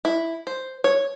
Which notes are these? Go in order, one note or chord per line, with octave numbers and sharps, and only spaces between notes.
E4
C5
C#5